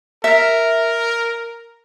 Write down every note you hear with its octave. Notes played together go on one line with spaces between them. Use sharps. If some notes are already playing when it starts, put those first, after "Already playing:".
A#4 E5